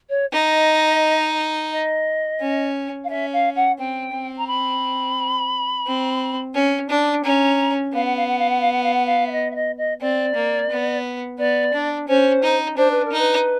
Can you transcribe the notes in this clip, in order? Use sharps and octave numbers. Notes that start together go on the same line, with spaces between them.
C#5
D#4 D#5
D#5
C#4
F5
C#4 E5
F5
F#5
C4 G5
C4
A#5
B5
C4
C#4
D4
C#4 A#5
B3 F5
F#5
F5
F#5
F5
F#5
F5
F#5
F5
F#5
F5
E5
D#5
E5
D#5
D#5
C4 D5
A#3
B3
B3 D5
D4
C#4 C5
D#4
D4 C5
B4
A#4
D#4
B4